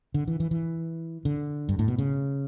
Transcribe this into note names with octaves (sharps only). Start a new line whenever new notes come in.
D3
E3
E3
E3
D3
G2
A2
B2
C#3